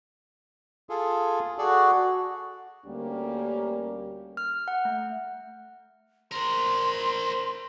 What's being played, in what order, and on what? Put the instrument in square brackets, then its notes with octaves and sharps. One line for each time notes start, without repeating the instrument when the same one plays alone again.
[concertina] F4 G#4 A4
[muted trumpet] F#4 [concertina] G#4 A4 D5
[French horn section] D2 G3 A#3 C#4 G4 A#4
[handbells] F6
F#5
A3
[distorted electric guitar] A#4 C5 [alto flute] C6